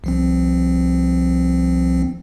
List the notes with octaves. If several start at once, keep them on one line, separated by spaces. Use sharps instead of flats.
C2 F3 C4